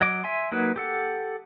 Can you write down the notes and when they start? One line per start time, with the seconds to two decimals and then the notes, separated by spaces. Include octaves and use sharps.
0.01 F#3 D#5 D6
0.24 E5 G#5 C6
0.52 F#3 A#3 D#4 F#4 B4
0.76 G4 A4 F#5